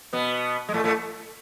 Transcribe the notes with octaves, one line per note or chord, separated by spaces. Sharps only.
B2 B3
G#3
A2 A3
A2 A3